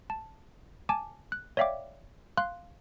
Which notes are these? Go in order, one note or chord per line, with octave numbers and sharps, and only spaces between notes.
A5
G#5 A5 D6
F#6
C#5 D5 E5 F5 G5 D6
F5 C6 F#6